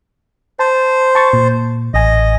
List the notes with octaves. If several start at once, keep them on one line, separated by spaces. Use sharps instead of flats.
C5 A5
A5 C#6 A6
A#2
A1 D#5 G#5